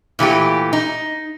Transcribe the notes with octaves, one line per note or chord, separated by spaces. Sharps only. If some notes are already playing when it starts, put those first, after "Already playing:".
A#2 E3 A3 G4
D#4